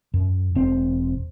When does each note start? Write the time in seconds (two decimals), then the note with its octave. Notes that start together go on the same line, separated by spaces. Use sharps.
0.14 F#2
0.55 E1 C4